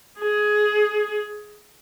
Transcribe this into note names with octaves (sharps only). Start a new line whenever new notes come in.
G#4